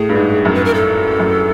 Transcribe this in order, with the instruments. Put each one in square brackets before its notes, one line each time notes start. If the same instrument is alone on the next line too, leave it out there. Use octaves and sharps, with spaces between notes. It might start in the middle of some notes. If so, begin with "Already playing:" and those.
Already playing: [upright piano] A2 [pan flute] G#4
[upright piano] G2
G#2
F#2
[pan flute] B4
A#4
A4
[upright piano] F#2